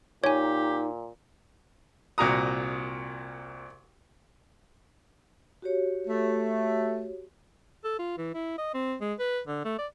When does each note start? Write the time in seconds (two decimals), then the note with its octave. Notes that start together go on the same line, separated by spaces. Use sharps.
0.24 A#2 D#4 G4 C#5 G#5
2.18 C2 A#2 F#4 A#5 D#6
5.62 F#4 G4 C#5
6.07 A3
7.84 A4
7.99 F4
8.18 E3
8.34 E4
8.58 D#5
8.74 C4
9.01 G#3
9.19 B4
9.47 D3
9.65 A3
9.79 D5